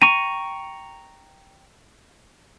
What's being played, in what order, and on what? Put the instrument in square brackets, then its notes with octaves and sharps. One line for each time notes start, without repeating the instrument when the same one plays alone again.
[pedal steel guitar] G5 A#5 C#6 [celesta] D#7